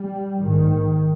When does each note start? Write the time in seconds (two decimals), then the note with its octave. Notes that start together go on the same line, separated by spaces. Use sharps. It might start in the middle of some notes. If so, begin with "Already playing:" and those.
Already playing: G3
0.39 A#1 G#2 D#3